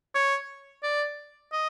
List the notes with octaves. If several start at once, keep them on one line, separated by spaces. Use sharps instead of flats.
C#5
D5
D#5